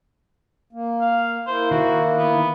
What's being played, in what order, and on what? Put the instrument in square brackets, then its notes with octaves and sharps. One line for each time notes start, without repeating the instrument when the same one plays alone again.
[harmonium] A#3
[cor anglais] F5
[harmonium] A#3 E4 [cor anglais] C5
[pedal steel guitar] D#3 [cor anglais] F#4
[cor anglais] B3